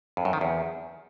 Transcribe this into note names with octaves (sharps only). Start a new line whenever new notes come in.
F2
F#2
D#3
E2